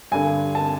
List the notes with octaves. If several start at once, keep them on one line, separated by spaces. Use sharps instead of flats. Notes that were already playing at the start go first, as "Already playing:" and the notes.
G2 D3 G#5
A5